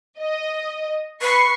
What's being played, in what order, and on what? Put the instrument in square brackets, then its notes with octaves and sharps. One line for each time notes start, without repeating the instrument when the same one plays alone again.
[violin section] D#5
[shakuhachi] B4 [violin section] C#6 C7